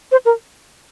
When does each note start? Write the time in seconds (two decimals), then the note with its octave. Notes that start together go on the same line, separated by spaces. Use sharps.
0.12 C5
0.25 A#4